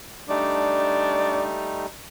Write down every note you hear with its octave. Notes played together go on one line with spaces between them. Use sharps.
G3 A3 D4 D#4